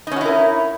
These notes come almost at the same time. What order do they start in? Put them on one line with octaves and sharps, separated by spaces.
D#4 C#4 F#4 E4 A#4